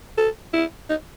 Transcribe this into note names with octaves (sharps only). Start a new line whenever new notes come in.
A4
E4
D#4